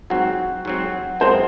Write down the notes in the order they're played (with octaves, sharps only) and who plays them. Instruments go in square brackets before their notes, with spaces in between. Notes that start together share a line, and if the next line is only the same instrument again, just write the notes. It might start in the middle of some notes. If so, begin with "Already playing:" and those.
[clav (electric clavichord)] G#2 F#3 C4 [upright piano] F#4
[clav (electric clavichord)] G#2 F#3 C4
[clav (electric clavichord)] F#2 F3 G#3 C4 [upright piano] C5